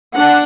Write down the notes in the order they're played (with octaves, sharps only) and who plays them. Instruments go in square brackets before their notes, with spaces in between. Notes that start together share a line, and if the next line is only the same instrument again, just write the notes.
[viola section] D4 F#5